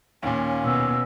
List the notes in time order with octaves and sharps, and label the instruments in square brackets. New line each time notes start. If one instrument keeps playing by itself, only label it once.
[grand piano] D#2 A#2 [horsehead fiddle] C#4
[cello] B2 [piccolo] E6